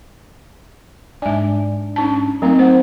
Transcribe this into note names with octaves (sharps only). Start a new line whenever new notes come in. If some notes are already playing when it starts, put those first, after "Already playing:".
G#2 D4 E5 G#5
C#4 D#4 A5
F#3 A3 A#3 C4 D#4
C5 F#5